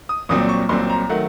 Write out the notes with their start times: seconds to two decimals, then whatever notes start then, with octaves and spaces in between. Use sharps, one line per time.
0.09 D#6
0.29 C2 A#2 F#3 C4 D#6
0.49 C#6
0.69 C2 A#2 F#3 C4 C6
0.90 A#5
1.09 D#3 F#3 A3 F#5